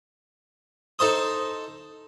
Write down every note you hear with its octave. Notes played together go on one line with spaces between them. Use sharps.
D#4 A4 C5 D#6